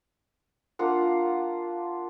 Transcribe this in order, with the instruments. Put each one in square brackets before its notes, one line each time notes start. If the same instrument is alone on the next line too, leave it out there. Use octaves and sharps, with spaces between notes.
[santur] A#3 D4 F4 F#5